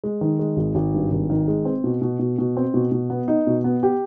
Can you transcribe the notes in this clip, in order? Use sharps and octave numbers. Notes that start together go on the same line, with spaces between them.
G#3
D#3
G#3
G#1
G#1
G2
G#1
D#3
G#3
C4
B2
B2
B2
B2
C4
B2
B2
B3
D#4
B2
B3
G4